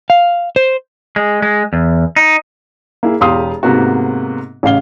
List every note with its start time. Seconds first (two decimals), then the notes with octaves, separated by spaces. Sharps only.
0.10 F5
0.56 C5
1.16 G#3
1.42 G#3
1.73 E2
2.16 D#4
3.03 A#3 E4 G#4
3.21 E1 E2 G4 F5 C6 D#6
3.63 G#2 C3 A#3 B3 F#4
4.63 A1 C#3 F5 G7